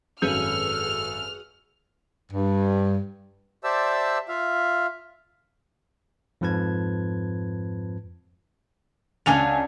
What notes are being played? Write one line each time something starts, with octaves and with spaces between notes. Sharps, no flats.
G#1 F#2 F#4 G#4 A4 B4 F6 G6
G2
G4 C5 D5 E5 A5 E6
F4 E5 F5
F2 G#2 F3 B4 A5 G#6
C#2 C#4 D4 F#4 G#5 F7